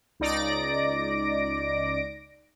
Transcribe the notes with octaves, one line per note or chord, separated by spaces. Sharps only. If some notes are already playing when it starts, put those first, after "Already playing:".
C#2 D#4 D5 A#6 D7